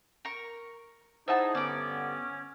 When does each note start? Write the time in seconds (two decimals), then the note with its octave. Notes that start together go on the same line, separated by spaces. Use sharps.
0.25 A#4 C#6
1.28 D#4 E4 G#4 C5 E5 F#5 A5
1.55 G2 D3 B3 C#4 D5 D6